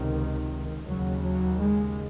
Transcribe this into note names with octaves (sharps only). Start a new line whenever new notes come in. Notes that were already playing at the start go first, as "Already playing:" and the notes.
Already playing: C#2 C3 D#3
D#2 C#3 F#3
F#3
G#3